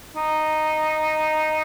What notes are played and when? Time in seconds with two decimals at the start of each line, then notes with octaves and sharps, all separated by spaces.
0.16 D#4